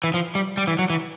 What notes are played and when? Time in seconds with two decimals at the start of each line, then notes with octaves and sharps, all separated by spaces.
0.04 E3
0.14 F3
0.35 G3
0.57 G3
0.67 E3
0.79 F#3
0.90 E3